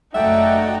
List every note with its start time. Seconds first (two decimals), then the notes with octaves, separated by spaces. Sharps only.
0.15 F#1 A3 D#4 F#4 D5 E5 F#5 G5